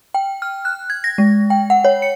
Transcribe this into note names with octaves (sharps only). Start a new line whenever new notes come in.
G5
F6
F#6
G#6
A#6
G#3
G5
F#5
C#5
C#7